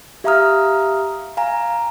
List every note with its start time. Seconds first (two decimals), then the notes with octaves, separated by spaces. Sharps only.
0.24 G4 E5 F5 A#5 D#6 F6
1.37 F5 G#5 A#5